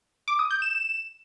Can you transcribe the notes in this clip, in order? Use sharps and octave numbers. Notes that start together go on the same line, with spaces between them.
D6
D#6
G6
E7